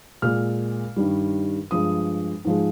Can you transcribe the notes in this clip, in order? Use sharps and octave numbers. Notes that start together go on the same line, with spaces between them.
A#2 G#3 F6
G2 D#3 G3
G2 F3 G#3 D#6
G#2 F3 G#3